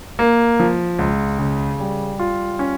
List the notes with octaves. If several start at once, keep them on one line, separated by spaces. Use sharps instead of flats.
A#3
F3
C#2
C#3
G3
F4
C#4